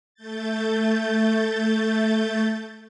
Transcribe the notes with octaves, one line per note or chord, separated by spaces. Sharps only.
A3 G6 A6